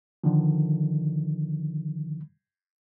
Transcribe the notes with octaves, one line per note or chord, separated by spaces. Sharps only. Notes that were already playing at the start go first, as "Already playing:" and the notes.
D3 D#3 F3